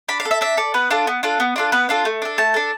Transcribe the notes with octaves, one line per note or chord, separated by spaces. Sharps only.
D4 B5
F5
A4
E5
D4 E5
A4 D5
B3 B4
D4 F4 A4
B3
D4 F4 A4
B3
D4 F4 A4
B3 B4
D4 F4 A4
A3
D4 A4
A3 A5
D4 A4